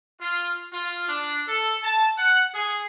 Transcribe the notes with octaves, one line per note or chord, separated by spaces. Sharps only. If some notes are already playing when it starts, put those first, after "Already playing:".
F4
F4
D4
A4
A5
F#5
G#4